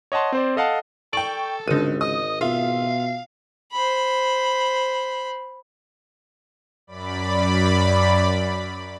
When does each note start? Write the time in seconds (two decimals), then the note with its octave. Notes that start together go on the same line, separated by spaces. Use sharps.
0.12 C#5 D#5 F#5 A5 C6
0.32 C4 C5 D5
0.56 A4 D#5 F5 F#5 A5
1.13 A4 D5 G5 C#6
1.68 G#1 C#2 D3 D#4 D#7
2.01 D#5 D#6
2.41 B2 F4 E5 F5
3.72 C5 B5
6.87 F#2 D5 B5